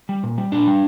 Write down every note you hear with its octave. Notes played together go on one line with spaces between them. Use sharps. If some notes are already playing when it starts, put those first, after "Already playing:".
G3
A#2
G3
A#2 D4
G3